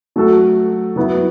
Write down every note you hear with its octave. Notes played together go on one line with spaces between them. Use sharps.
F#3 A3 F#4 A4
F#3 B3 E4